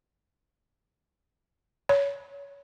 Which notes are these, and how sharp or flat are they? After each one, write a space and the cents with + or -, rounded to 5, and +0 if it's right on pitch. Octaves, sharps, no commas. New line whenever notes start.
C#5 +20